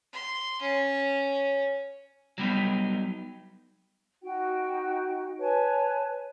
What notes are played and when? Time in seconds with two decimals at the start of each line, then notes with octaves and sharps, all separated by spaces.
0.13 C6
0.62 C#4
2.38 F#3 G3 B3 D#4
4.22 D#4 F#4 G5
5.39 B4 C#5 G#5 A5